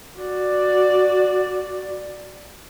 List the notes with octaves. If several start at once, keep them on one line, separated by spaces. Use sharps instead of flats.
F#4 D5